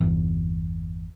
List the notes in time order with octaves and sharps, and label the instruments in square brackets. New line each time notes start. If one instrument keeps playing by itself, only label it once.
[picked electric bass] G1 E2